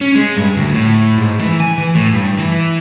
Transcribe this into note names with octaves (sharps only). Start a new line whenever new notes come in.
C#4
G#3
G2
D2
A2
G#2
E3
G#5
E3
A2
G2
E3